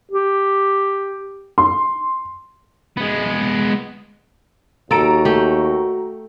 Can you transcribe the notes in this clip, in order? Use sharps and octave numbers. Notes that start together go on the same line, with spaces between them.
G4
C6
G#3 B3
D#2 F#4 A4 A#5 D7
A3 G4